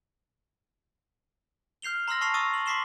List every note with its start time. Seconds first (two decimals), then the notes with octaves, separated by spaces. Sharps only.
1.82 F6 G6 C7 F7 G7
2.08 A#5 C6 E6 F6 A#6
2.21 A5 C#6 A#6 C7 F7
2.34 C#6 D#6 E6 A6 D#7
2.54 F#7
2.66 C6 D6 B6 C7 E7 G7